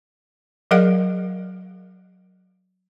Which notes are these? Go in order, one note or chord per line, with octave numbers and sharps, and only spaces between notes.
F#3 G#4 A#4 D5 F5 F#5